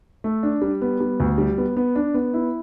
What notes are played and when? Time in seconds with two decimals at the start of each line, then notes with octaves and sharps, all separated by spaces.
0.24 A3
0.43 D4
0.62 G3
0.81 B3
1.00 G3
1.20 D2
1.38 G3
1.58 B3
1.77 B3
1.96 D4
2.14 B3
2.34 E4